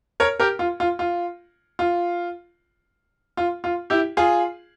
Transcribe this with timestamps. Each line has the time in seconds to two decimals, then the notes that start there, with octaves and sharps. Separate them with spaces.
0.20 A#4 C#5
0.40 G4 A#4
0.59 F4
0.80 F4
0.99 F4
1.79 F4
3.37 F4
3.64 F4
3.90 E4 G4
4.17 F4 G#4